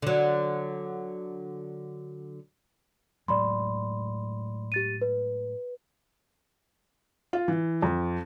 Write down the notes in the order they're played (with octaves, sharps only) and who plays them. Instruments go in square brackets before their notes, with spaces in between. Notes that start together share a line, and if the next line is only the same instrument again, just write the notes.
[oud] D3 F#3
[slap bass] A2 F#3 G#3 [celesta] D5 B5 C6
[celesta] G4 A6 D#7
B4
[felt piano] F4
E3
F2